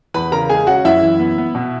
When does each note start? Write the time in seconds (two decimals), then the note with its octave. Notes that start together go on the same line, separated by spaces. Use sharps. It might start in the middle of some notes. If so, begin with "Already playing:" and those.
0.14 E2 B4 B5
0.32 C#3 A#4 A#5
0.49 G#3 G#4 G#5
0.67 C#4 F#4 F#5
0.85 F#2 E4 E5
1.03 E3
1.20 B3
1.38 B3
1.55 B2